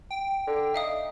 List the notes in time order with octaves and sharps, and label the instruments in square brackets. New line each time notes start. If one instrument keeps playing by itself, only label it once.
[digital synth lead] G5
[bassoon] D3
[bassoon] D#4 [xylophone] E5 F5 D#6